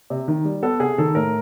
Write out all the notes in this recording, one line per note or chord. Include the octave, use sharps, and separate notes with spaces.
C3
D#3
G3
B3 A4
C3 G#4
D#3 A4
A2 A#4